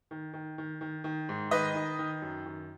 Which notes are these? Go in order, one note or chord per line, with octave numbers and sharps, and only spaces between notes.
D#3
D#3
D#3
D#3
D#3
G#2
D#3 B4 D#5
D#3
D#3
F#2
D#3